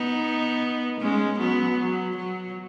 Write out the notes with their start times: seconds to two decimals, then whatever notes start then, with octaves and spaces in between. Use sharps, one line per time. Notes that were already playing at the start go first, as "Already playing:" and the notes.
Already playing: B3 D#4
1.00 G#3 C#4
1.39 F#3 B3
1.78 F#3
2.17 F#3